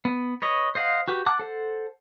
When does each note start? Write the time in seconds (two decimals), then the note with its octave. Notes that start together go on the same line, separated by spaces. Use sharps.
0.05 B3
0.42 B4 C#5 D#5
0.75 C5 D#5 F5 F#5
1.08 F#4 G4 B4
1.26 F#5 A5 D6 F#6
1.39 A4 C5 F#5